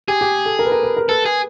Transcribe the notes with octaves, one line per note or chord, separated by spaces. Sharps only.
G4 G#4
G4
A4
A#4
B4
A#4
B4
A#4
A4 B4
G#4